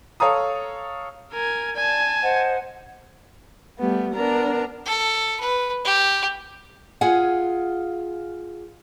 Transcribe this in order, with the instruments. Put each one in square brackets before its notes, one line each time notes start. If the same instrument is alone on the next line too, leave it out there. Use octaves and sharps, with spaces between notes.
[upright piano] A4 C#5 F5 A#5 D#6
[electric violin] A#4 G#5
[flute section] D5 [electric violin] G#5 A5
[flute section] C5 D#5 F#5
[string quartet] G3 A3 B3
B3 D4 A#4 A#5
[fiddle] A4
B4
G4
[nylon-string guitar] F4 G#4 F#5 G#5